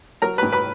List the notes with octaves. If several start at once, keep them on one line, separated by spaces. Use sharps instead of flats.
F#3 A#4 A#5
G#2 B4 B5
B4 B5